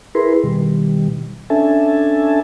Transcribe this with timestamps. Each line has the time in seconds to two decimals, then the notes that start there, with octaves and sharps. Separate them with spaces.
0.15 E4 G#4 A#4 B4 C6
0.44 B2 D#3 G3
1.50 C#4 D4 A4 E5 G#5 A5